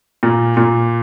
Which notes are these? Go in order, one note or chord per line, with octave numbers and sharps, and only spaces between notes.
A#2
A#2